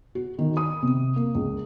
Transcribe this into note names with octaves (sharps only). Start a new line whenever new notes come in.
F#4
D#3
D#6
C3
A#3
C#2